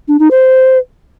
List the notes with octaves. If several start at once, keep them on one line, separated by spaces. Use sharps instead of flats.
D4
D#4
C5